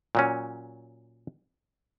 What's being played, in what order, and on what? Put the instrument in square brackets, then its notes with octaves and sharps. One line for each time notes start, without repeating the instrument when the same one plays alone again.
[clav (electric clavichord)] A#2 F#3 C#4